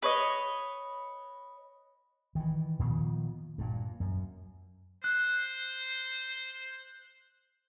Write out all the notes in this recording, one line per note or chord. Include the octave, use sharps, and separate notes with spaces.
B4 C#5 D#5
D#3 E3
A#2 D#3 F3 B3
G2 A#2
F#2
C5 F#6